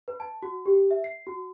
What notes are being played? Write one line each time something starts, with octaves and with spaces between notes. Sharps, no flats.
B4
A5
F#4
G4
E5
C7
F#4